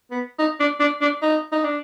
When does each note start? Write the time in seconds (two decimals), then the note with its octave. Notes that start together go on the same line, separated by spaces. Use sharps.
0.11 B3
0.39 D#4
0.60 D4
0.80 D4
1.02 D4
1.22 D#4
1.52 D#4
1.65 D4